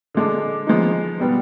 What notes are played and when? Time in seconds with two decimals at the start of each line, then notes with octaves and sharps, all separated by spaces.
0.14 D3 G#3 D4
0.67 F3 G#3 B3 D#4
1.20 B2 G3 B3